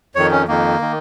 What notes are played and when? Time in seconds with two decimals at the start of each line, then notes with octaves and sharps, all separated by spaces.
0.15 F2 D#3 C#5
0.31 C#4
0.48 F2 D#3 A#3
0.81 D#3